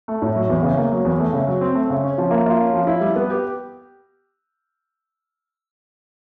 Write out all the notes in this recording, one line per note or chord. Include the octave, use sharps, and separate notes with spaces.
A3
A2
F#3
E2
C#3
A#3
F#3
E2
A3
C#3
F#3
C4
A3
C#3
C#4
F3
A#3
F4
C#4
F3
E4
G3
B3
G4